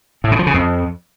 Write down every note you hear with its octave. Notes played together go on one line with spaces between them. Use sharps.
A2
C#3
F3
C#3
F2